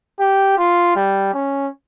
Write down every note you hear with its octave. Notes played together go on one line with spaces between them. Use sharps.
G4
F4
G3
C#4